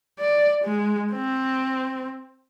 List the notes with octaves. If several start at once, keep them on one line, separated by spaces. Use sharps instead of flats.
D5
G#3
C4